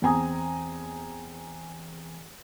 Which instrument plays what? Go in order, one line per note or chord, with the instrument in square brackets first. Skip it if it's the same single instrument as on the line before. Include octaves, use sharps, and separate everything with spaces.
[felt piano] E2 C4 G#5 A#5 D#6